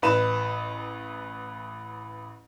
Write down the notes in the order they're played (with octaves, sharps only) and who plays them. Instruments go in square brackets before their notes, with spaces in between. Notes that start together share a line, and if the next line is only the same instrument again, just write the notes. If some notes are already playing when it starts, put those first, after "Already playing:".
[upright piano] A1 B4 E7